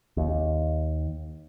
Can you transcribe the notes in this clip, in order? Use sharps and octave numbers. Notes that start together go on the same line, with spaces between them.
D#2